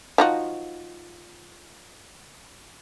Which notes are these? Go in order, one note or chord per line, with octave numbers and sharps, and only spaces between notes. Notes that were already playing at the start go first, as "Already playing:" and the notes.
F3 D#4 F#4